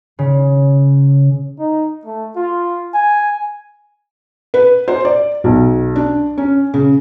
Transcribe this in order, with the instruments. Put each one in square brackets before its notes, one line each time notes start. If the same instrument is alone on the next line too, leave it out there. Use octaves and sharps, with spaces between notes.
[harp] C#3
[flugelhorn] D#4
A3
F4
G#5
[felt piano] B4
C5
D5
B1
D4
C#4
C#3